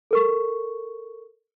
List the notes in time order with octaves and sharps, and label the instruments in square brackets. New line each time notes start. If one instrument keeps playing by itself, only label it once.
[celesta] A4 A#4 C#6